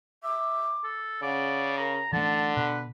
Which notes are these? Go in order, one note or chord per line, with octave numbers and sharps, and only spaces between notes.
E5 D6
A4
C#3 D5 F#5
A#4 A#5
D3 E3 A3 F#5 A5
B2 B4